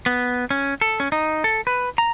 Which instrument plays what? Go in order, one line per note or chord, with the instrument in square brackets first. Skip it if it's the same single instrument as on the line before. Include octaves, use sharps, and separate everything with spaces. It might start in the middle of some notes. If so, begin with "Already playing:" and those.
[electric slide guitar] B3
C#4
A4
C#4
D#4
A4
B4
A#5